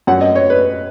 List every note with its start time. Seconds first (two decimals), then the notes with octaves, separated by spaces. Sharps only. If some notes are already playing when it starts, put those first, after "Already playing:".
0.07 F#2 F#3 F#5
0.21 D#5
0.36 C#5
0.50 B4